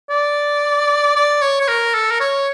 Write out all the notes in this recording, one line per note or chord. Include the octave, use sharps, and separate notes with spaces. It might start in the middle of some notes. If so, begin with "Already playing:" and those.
D5
D5
C#5
C#5
A#4
A4
A#4
C#5